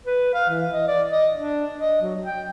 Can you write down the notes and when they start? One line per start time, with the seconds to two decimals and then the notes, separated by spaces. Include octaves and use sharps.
0.05 B4
0.34 F5
0.49 E3
0.71 D#5
0.88 D5
1.09 D#5
1.35 D4
1.79 D#5
2.02 F#3
2.24 G5